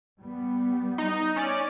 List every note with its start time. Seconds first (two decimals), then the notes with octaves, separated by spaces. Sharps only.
0.21 G3 B3
0.98 D#4
1.36 C#4 D5